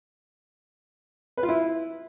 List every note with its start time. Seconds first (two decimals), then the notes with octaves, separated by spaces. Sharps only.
1.37 B4
1.43 F4
1.49 E4